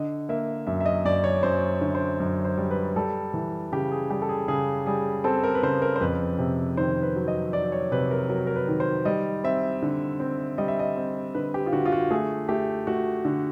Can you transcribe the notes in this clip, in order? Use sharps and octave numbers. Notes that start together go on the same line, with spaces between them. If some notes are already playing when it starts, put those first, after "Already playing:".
Already playing: D3 D#5
A#3 E5
F#2 E5
E5
D#5
F#2 D5
C#5
F#2 C5
D3
C5
F#2
C5
G3
B4
G3 A4
E3
C#3 G4
G#4
G3 G4
A4
G#4
C#3 G#4
G3 G#4
C4 A4
A#4
B4
C#3 C5
A#4
C5
F2 B4
C3
D#3 C5
B4
F#3
D#5
F#3 D5
C#5
C3 B4
A#4
F#3 A#4
A#4
B4
D#3
C5
G3 D#5
C4 E5
D3
C4
G3 D#5
E5
D#5
C4
D3 B4
G4
F4
D3 F#4
F4
F#4
A3 G#4
A3 G4
A3 F#4
D3